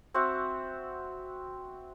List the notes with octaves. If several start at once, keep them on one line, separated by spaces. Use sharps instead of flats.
C4 F#4 E5 F#5